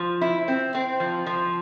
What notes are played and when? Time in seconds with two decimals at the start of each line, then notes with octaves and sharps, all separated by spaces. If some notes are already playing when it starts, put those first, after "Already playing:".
Already playing: F3
0.21 E4
0.48 C4
0.75 C4
1.00 F3
1.27 F3